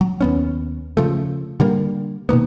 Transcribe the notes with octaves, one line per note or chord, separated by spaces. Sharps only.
F#3
D#2 B3 C#4
C#3 F3 A3
D3 G3 A#3
B2 D#3 A#3 B3